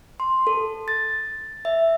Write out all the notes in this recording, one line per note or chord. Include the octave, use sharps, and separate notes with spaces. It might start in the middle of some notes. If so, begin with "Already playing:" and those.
C6
A4
A6
E5